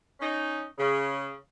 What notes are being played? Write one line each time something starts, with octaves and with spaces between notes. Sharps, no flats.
C#4 D#4
C#3